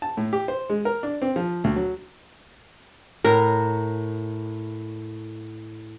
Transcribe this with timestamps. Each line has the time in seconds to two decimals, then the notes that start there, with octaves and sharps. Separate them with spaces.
0.02 A5
0.17 A2
0.33 G4
0.48 C5
0.70 G#3
0.85 A#4
1.03 D4
1.22 C4
1.36 F3
1.64 D2
1.76 F#3
3.24 A2 A#4